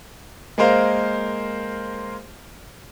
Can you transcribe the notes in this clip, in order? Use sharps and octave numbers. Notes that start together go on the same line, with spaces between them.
G#3 A#3 A#4 C5 F5